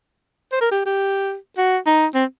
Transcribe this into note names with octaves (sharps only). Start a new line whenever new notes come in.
C5
A#4
G4
G4
F#4
D#4
C4